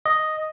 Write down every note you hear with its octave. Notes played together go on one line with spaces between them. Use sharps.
D#5